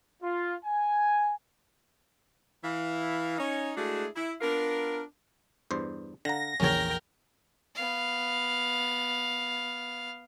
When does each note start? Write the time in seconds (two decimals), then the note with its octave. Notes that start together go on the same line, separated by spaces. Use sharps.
0.23 F4
0.65 G#5
2.64 E3 E4 F5
3.38 C#4 D#4 C#5
3.77 G#3 A3 D4 E4 F#4 G#4
4.16 E4
4.41 B3 D4 F4 A#4
5.71 E2 G2 C5
6.25 D3 F5 F#5 A#5 A#6
6.60 A#1 E2 C#4 A#4 C#5 G5
7.75 B3 F5